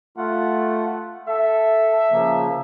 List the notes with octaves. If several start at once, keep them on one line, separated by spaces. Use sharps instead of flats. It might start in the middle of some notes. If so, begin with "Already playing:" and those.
A3 F4 F#5
A4 E5
C#3 F3 A#3